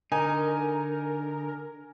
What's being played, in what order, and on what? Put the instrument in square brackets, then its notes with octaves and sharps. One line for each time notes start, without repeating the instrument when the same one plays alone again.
[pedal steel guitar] D3 [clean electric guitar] D#4 [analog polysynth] A#4 [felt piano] G#5